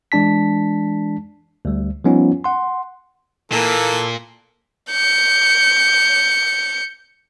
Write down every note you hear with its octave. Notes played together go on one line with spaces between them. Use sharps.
E3 G#3 D4 A5 B6
D2 G3
F3 G3 B3 C#4 D#4 F4
F#5 C6
A#2 E3 A#3 A4
G6 C#7